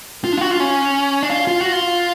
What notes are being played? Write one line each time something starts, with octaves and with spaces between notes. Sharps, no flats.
F4
D4
F4
F#4
F4
C#4
D4
F4
F4
F#4
F4